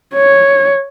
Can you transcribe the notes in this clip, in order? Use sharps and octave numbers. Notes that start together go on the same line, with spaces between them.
C#5